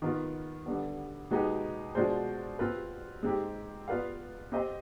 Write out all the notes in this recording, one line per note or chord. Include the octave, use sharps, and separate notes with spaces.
D#3 B3 F4
D3 G3 B3
B2 G#3 B3 D#4 G4
B2 G#3 D4 F4 C5
C4 F4 B4
G#3 C4 D#4 G4
B3 F4 B4 D5 F5
C4 G4 C5 D#5